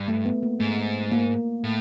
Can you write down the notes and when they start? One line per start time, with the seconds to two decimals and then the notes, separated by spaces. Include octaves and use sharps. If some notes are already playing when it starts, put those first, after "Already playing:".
Already playing: G2
0.08 A3
0.26 B3
0.43 A#3
0.60 G#2 A3
1.12 A#3
1.64 A2